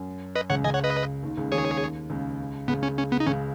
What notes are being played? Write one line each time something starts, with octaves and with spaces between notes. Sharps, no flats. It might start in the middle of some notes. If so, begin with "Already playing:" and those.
Already playing: F#2
B4 D#5
C#2 C#3 C#5 F#5
C#2 C#3 D#5 G#5
C#5 F#5
B4 D#5
D#2 D#3
C#2 C#3
D#2 D#3 G#4 C#5
C#2 C#3
C#2 C#3 B3
C#4
C#4
B3
D#4
C#2 C#3 C#4